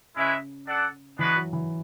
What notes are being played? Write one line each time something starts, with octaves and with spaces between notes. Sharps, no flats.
C#3 G#3 C#4 E4 B4 E5
D4 A4 D5 F#5
E3 G#3 B3 D4 F#4 B4
F#3
E3